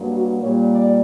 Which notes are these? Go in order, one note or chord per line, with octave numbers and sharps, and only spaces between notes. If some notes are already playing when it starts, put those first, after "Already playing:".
Already playing: G2 F#3 A#3
F#4
A#2 G3 A#3 C#5
D5